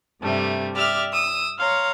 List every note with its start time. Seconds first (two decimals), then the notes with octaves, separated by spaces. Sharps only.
0.21 G2 C3 G3 A3
0.74 G4 D5 E5 F6
1.12 D#6 E6
1.58 C#5 F5 A#5 C6